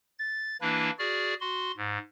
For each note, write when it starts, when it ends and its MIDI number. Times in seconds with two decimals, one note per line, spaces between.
0.19 0.56 93
0.61 0.90 52
0.61 0.90 58
0.61 0.90 62
0.61 0.90 64
0.61 0.90 71
0.99 1.34 66
0.99 1.34 68
0.99 1.34 74
0.99 1.34 89
1.41 1.72 66
1.41 1.72 84
1.77 1.98 44